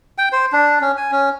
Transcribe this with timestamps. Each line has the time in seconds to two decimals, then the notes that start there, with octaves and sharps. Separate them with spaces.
0.18 G5
0.32 C5
0.52 D4
0.81 C#4
0.97 G#5
1.11 C#4